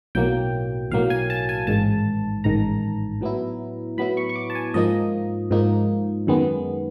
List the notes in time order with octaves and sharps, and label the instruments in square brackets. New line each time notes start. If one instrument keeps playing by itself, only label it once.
[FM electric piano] B1 A2 F#3 A#3 G5
B1 A2 F#3 A#3 F5
G#5
A5
G#5
A1 G#2 D#3 A5
A1 G#2 D#3 A#5
A2 F#3 B3 E4
A2 F#3 B3 E4 B5
C#6
C#6
D6
A5
G#5
G#2 F3 A#3 D#4 D#5
G#2 F3 A#3 D#4
F#2 D#3 G#3 B3